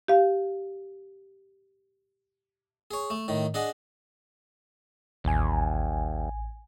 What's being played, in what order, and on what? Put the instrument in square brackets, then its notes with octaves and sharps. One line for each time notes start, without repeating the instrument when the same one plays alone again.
[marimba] G4 F5
[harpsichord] G#4 C#5
A3
A2 D#3
D4 G#4 D#5 F#5
[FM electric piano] A1 G#5 [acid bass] D#2